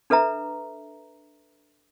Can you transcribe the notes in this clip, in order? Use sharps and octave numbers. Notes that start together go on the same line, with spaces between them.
D4 A4 B4 E5 A#5